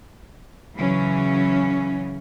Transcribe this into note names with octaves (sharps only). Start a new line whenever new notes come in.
C#3 E3 F#3 C#4